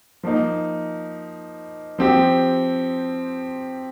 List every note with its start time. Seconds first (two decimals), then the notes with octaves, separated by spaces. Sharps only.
0.23 F3 A#3 D#4
1.98 F3 C4 G4